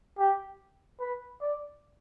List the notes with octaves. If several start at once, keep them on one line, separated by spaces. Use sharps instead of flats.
G4
B4
D5